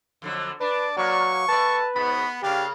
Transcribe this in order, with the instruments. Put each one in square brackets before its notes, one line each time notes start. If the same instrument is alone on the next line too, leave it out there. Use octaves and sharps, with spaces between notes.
[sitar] F2 D3 F#3
[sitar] D4 [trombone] B4 [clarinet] D5 [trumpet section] A5 D6
[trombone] F#3 [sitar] A#3 B4 [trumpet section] C#6
[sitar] A3 D5 [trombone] B4 [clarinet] A5
[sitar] G#2 B2 [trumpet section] B3 [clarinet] B5
[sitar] C#3 A#3 [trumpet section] D4 F5 [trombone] G4